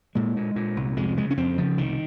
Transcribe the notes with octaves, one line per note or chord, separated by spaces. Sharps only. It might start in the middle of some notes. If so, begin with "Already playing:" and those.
A#2 G#3
A#2
A#2
C2
F2 G#3
C#3 G#3
C#4
F2 C4
C#3 F3
C2 D#3